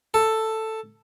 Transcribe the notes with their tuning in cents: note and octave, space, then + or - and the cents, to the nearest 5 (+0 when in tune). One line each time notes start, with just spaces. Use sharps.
A4 +5